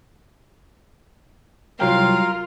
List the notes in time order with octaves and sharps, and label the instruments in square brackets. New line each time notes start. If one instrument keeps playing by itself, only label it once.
[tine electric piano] C2 F#3 G5 [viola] F4 [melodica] A#4 [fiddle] F5 C6